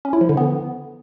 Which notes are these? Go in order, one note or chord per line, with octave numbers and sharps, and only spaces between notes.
C#4
E4
F3
D3
B3